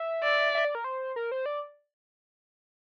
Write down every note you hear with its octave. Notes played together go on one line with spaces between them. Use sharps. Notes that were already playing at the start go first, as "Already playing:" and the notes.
Already playing: E5
D5
E5
D5
A#4
C5
A#4
C5
D5